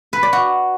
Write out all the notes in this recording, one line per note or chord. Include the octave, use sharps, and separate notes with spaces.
B4
D5
F#4